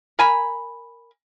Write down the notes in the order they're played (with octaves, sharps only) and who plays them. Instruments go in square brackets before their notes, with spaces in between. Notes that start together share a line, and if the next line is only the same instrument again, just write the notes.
[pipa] A#4 G#5 B5